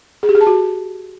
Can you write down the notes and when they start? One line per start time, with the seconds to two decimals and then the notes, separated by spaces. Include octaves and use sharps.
0.23 G#4
0.29 G4
0.35 G#4
0.41 A5
0.47 F#4